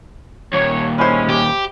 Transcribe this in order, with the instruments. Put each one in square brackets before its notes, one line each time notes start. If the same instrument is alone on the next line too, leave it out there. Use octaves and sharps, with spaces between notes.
[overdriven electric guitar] D#2 A#2 [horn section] C#5
[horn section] G#3 C#4 [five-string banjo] E4 C5
[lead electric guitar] G4